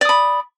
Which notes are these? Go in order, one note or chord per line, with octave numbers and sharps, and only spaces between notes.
D5 B5 D#6